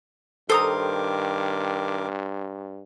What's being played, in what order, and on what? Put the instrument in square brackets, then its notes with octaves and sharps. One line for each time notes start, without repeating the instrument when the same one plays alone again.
[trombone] G2 [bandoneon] D#3 A#4 D6 [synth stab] A4 A#5 [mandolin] C5 D#6